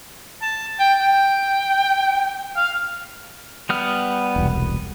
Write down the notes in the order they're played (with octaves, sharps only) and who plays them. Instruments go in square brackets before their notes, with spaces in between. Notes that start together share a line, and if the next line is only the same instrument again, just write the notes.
[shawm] A5
G5
G5
F5
[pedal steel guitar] G3 B3 F6
[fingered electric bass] E1 C2